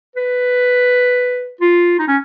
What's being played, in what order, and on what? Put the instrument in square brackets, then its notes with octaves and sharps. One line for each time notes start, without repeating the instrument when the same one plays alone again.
[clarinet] B4
F4
D#4
C#4